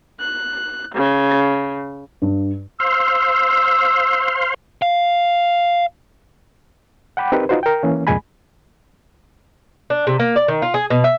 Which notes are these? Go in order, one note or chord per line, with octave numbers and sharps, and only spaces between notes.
F#6
C#3
G2
C5 F5 C6 E6
F5
F#5 G5 B5 D6
C4 D#4 G4 A#4 B4
D#4 F4 F#4 B4 C5
A#4 G5
E3 A#3 C#4
C2 F2 A#2 G#3 G#5 B5
D4
C3
A#3
D5
D#3
F4
G#4
B2
E5